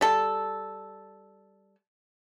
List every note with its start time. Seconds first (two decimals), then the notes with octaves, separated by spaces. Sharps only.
0.01 G3 A4